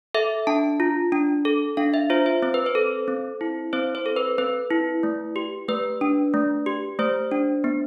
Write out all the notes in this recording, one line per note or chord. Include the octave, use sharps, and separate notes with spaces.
A4 E5
D4 A5
F4
D4
A4
D4 F5
E5
F4 C5
C5
C4 C5
B4
C5
A4
C4
E4
C4 C5
C5
A4
B4
C4 B4
E4
A3
G4
A3 B4
D4
A3
G4
A3 C5
D4
B3